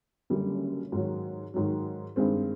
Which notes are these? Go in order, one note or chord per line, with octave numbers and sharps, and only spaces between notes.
F#1 F#2 D3 G3
G#2 D#3 F#3
G#2 D#3 F#3
G2 D#3 G#3 C4